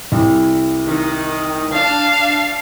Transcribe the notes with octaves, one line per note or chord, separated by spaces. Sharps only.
C2
D#3
D4 F5 A5